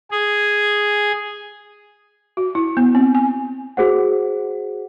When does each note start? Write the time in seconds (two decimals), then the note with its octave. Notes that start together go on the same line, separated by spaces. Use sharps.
0.11 G#4
2.37 F#4
2.55 E4
2.77 B3
2.95 C4
3.15 G#5
3.77 F#4 G#4 C5 F#5